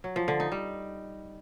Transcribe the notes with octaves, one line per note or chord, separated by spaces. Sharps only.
F#3
F3
D3
D#4
G3